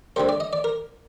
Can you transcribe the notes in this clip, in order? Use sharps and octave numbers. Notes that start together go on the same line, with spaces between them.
D2 D3 G3 A#3 C5
D5
D#5
D5
A#4